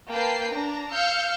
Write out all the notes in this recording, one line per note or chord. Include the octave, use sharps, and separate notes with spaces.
A#3 B4 G5 A5 C7
D4 A#5
F5 E6 F6 G6 C#7